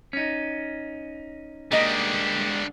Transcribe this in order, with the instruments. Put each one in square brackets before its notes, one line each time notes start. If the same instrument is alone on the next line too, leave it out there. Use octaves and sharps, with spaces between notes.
[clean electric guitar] C#4 D#4
[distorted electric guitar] D3 G3 [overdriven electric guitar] G#3 D4 [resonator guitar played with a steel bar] A#3 D#5